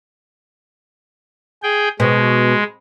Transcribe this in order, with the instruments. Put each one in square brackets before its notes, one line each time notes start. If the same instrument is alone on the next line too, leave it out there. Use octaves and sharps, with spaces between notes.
[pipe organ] G#4 G5
[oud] B2 [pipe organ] G#3